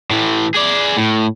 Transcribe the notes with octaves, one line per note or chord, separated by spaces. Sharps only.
A2 E3
G#4 D5
A2